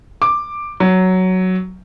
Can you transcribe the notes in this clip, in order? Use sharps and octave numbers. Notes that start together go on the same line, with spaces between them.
D6
F#3